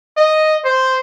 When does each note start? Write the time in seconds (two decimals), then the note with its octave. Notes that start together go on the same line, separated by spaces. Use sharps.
0.17 D#5
0.65 C5